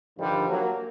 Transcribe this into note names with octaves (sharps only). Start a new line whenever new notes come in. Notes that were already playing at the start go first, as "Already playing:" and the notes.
G2 D3 D#3 F3 G3
F#3 A#3